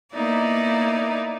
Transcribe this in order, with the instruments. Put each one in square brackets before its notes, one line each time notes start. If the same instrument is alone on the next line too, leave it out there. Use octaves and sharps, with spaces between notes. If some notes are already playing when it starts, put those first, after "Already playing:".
[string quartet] A#3 B3 D#4 E4 D5